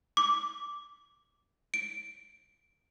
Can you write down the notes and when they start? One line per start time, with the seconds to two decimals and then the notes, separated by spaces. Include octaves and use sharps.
0.17 D6
1.74 D7